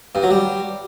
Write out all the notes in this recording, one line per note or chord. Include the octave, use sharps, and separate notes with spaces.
G2
F#3
G3